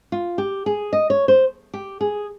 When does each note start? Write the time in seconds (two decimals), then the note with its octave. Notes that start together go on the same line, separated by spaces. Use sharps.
0.12 F4
0.38 G4
0.66 G#4
0.93 D#5
1.10 C#5
1.28 C5
1.74 G4
2.01 G#4